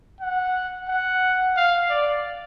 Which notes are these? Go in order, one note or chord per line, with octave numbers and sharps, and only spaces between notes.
F#5
F#5
F5
D5